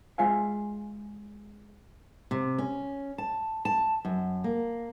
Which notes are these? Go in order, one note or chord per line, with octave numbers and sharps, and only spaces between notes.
G#3 F4 E5 F5 G#5
C3
C#4
A5
A5
F#2
A#3